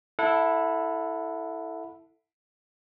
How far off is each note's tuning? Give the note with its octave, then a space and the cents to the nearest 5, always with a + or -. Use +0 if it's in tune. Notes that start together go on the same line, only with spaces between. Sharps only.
E4 +0 A4 +5 F#5 -30